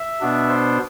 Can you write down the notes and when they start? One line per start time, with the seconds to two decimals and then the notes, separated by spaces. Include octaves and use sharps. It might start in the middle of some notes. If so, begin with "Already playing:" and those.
Already playing: E5
0.21 B2 B3 D4
0.49 C5